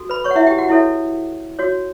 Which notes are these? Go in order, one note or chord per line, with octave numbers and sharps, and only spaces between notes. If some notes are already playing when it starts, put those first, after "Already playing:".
Already playing: F#4 A4
B4 B5
C#5 C#6
F#5
E4 E5
G4 G5
F#4 F#5
E4 A4 C#5 E5
F#4 C#5